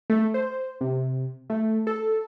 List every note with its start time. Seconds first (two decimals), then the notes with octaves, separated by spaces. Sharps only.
0.10 A3
0.34 C5
0.81 C3
1.50 A3
1.87 A4